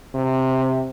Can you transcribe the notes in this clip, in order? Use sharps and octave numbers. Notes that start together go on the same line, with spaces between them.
C3